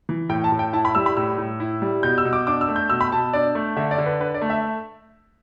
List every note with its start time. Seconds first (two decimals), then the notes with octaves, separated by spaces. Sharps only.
0.09 E3
0.29 A2 G5
0.44 A5
0.52 A2
0.59 G5
0.73 E4 A5
0.85 B5
0.95 G3 E6
1.06 B5
1.17 A2 E6
1.38 A2
1.60 E4
1.82 G3
2.03 B2 G6
2.18 E6
2.25 B2
2.33 D6
2.47 D4 D6
2.61 E6
2.68 A3
2.76 G6
2.90 B2 E6
3.01 B5
3.12 B2 A5
3.33 D4 D5
3.55 A3
3.76 D3 E5
3.91 D5
3.98 D3
4.06 B4
4.20 D4 B4
4.34 D5
4.41 A3
4.50 E5